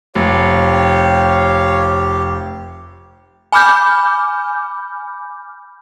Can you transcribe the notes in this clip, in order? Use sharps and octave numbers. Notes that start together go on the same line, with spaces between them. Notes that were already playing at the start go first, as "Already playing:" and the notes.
F1 G4 C#5 F5
G#5 B5 D6 F6 G6